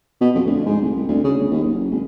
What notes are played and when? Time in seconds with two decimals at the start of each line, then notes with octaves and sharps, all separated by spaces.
0.21 B2
0.35 F2
0.46 D2
0.66 G#2
0.81 C2
0.96 C2
1.08 D2
1.24 C#3
1.38 G1
1.51 D#2
1.64 F#1
1.91 G#1